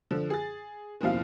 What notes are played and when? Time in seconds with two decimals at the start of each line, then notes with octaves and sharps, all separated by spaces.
0.11 D3 F3
0.30 G#4 A6
1.01 F#1 D#2 B2 F3 E4 F5